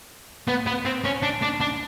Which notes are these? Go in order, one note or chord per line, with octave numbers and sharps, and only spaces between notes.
B3
B3
C4
C#4
D4
D4
D4